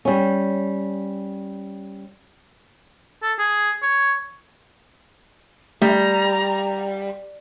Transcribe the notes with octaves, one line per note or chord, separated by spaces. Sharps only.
G3 C#4
A4
G#4
C#5
G3 A3 A#5